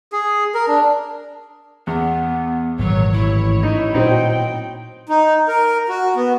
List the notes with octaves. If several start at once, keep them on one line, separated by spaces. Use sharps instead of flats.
G#4
A#4
D4
E2 B3
G#1 A#2 E3 F#3 C#5
A1 E4 C#5
D#4
A#2 F#3 C4 D#4 G5
D#4
A#4
F#4
B3